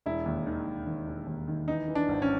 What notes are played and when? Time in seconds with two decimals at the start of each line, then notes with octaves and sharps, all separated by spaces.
0.06 E1 E4
0.26 D#2
0.46 D#3
0.67 E1
0.87 D#3
1.06 E1
1.27 D#2
1.48 D#3
1.68 E3 D#4
1.88 E3
1.95 D4
2.09 G#1
2.22 C#4